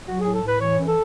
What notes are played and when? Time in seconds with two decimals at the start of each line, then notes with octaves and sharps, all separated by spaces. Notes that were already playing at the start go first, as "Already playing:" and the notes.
0.07 F#3 F#4
0.21 G#4
0.25 A2
0.33 A4
0.43 A2 B4
0.60 E3 C#5
0.78 F#2
0.86 A4